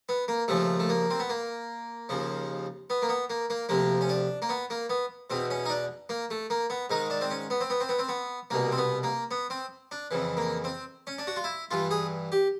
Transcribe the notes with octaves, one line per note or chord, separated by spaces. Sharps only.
B3
A#3
D#2 C#3 F3 A3
A3
A#3
C4
B3
A#3
D#2 C#3 F3
B3
A#3
B3
A#3
A#3
D2 C3 F3 A#3
C#4
D4
A#3
B3
A#3
B3
E2 B2 C4
C#4
D#4
D4
A#3
A3
A#3
B3
G#2 D#3 D#4
D4
C4
C#4
B3
C4
B3
C4
B3
C4
B3
C2 B2 A#3
C4
B3
A#3
B3
C4
D4
F2 C#3 E3
A#3
C4
C#4
D4
F#4
F4
E4
G2 E3 F4
G#4
G4